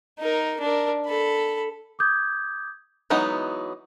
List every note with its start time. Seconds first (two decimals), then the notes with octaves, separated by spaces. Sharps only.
0.19 D#4 A#4
0.60 D4 A#4
1.07 A4 B5
1.99 D6 D#6 G6 G#6
3.10 E3 F#3 G#3 B3 D#4